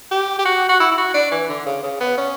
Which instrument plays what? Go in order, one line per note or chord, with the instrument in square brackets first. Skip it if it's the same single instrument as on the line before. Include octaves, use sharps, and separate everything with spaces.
[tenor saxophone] G4
G4
F#4
F#4
E4
E4
F#4
D4
E3
D3
C#3
C#3
B3
C#4